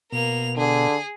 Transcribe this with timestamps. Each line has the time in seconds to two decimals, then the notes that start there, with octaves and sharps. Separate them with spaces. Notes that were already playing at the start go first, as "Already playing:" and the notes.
0.12 B2 A#3 F7
0.57 D3 G#4